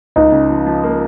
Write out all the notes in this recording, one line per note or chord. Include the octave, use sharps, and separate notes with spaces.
C#2 D#4
C#3
F3
F3
A#3